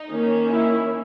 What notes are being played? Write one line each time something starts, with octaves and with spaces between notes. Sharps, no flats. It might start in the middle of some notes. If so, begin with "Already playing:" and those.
Already playing: D#4
D#3 A#3 C#4
E4